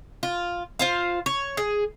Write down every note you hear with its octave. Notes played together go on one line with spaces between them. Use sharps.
F4
F4 C5 F5
C#5
G#4